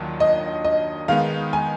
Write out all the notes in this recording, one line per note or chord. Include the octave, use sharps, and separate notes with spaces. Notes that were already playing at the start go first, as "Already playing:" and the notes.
Already playing: D#2 D#3 F#3 D4 F4
D#5
D#5
D#3 G#3 B3 D#4 F5
G#5